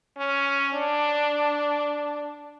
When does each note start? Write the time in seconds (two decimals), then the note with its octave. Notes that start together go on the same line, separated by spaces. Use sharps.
0.18 C#4
0.74 D4